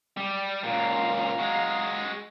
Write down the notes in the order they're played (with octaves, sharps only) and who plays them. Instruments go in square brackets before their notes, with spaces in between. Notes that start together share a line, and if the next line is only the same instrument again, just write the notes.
[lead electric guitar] G3
[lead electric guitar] C#2 A#2 [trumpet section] F5 A#5
[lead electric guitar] G#3 F#4